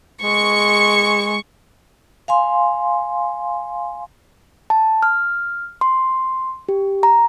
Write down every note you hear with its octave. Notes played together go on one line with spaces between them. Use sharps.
G#3 C#6
F5 G#5 C6
A5
F6
C6
G4
A#5